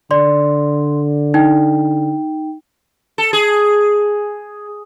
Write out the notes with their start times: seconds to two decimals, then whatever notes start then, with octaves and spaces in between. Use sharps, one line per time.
0.11 D3 D5 C6
1.34 D#4 G5
3.18 A4
3.33 G#4